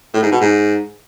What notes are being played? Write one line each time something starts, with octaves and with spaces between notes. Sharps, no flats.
A2
G#2
B2
G#2